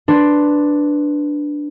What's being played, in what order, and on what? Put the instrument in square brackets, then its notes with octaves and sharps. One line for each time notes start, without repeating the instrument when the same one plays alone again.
[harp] D4 B4 C6